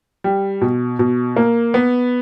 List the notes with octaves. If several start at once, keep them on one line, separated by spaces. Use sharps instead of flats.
G3
B2
B2
A#3
B3